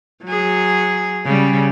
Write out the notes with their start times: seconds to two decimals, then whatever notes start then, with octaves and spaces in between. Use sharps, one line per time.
0.24 F#3 G#4
1.24 C#3 G3